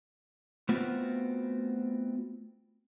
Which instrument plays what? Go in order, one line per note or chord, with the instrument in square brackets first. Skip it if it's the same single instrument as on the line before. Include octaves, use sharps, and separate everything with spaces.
[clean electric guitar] A3 B3 C4 F4 F#4